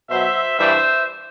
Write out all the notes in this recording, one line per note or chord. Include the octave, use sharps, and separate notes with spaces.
B2 F#3 C5 E5
G2 E3 G3 C5 E5